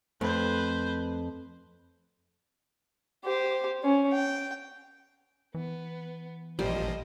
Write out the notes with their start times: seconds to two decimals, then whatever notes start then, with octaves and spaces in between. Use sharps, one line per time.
0.21 F2 A3 B4 C5
3.25 G4 C5
3.83 C#4
4.13 G5
5.54 E3 B3
6.59 A1 A#2 F3 G3 C5 D#5